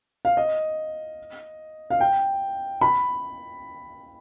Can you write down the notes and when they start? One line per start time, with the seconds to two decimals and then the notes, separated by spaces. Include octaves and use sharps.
0.25 F5
0.37 D#5
1.90 F5
2.00 G5
2.81 B5